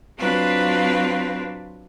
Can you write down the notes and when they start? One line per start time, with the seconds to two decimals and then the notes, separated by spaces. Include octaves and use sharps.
0.18 F#3 C4 D4 F4 B4